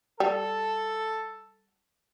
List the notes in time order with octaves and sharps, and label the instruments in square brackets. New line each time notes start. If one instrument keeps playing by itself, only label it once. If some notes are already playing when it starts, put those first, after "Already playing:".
[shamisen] G3 [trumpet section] A4